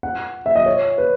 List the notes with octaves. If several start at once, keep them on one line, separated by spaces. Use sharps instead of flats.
F#5
E5
D#5
C#5
B4